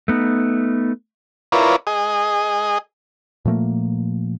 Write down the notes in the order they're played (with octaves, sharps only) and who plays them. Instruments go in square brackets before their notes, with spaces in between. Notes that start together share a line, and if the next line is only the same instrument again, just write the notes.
[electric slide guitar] A3 B3 D#4
[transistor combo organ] E4 F4 A#4 B4 C#5 D5
G#4 D#5
[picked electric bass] A#2 F3 A3 A#3